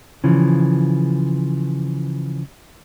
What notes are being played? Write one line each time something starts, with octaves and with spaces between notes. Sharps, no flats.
C#3 E3 F3